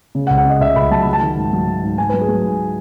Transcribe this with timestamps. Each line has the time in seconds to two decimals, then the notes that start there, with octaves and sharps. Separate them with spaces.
0.15 C#3
0.27 F#5
0.30 C#2
0.38 F#5
0.45 C#3 D#5
0.61 C#2 E5
0.76 C#2 B5
0.91 F#3 A5
1.02 F#3 B5
1.13 A5
1.21 D#3
1.37 G#2
1.53 F#3
1.67 D#3
1.83 G#2
1.98 G#2 G#5
2.09 F#3 B4
2.21 G#4
2.29 F#3
2.44 G#2